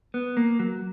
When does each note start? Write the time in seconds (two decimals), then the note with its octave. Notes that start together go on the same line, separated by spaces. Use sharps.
0.14 B3
0.37 A#3
0.59 F#3